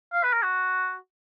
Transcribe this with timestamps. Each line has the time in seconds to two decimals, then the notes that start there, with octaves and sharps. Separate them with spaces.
0.13 F5
0.24 B4
0.33 A#4
0.43 F#4